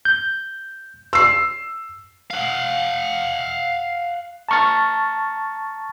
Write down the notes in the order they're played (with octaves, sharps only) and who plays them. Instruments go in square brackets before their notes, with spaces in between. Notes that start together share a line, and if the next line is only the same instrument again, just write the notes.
[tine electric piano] G6
[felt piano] E6 C7
[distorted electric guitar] F5 F#5
[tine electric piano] A5 A#5 C#6 F6 A6